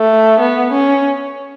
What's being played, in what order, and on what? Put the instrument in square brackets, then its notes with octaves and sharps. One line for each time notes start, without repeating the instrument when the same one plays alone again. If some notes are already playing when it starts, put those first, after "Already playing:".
Already playing: [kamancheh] A3
B3
C#4